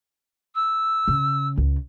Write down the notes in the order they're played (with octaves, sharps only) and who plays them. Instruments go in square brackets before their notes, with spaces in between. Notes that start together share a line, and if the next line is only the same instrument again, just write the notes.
[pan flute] E6
[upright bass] C#3
C#2